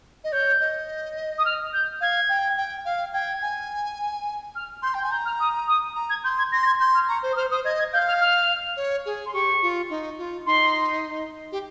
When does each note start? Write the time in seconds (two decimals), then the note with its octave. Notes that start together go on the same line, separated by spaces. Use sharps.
0.24 D#5
0.32 C#5 G6
0.61 D#5
1.38 D#6
1.45 F6
1.73 G6
2.01 F5 G#6
2.29 G5
2.57 G5
2.85 F5
3.13 G5 G#6
3.42 G#5
4.55 F6
4.82 C6 G6
4.94 G5 G6
5.03 G#5
5.11 A#5 G6
5.25 F6
5.39 D#6
5.67 D#6
5.96 A#5
6.09 G#6
6.24 C6 G6
6.38 G#6
6.52 C6 A#6
6.62 A#6
6.66 G#6
6.79 C6 G6
6.94 F6
7.08 A#5 C#6
7.23 C5
7.32 D#6
7.36 C5 F6
7.50 C5 D#6
7.64 D#5 G#6
7.78 G#6
7.93 F5 G6
8.07 F6
8.21 F6
8.77 C#5
9.06 G#4
9.26 C6
9.33 G4 C#6
9.62 F4
9.90 D#4
10.18 F4
10.46 D#4 C6
11.52 G4